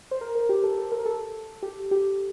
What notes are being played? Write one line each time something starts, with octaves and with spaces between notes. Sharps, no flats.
C5
A#4
A#4
G4
A4
A4
A#4
A4
G4
G4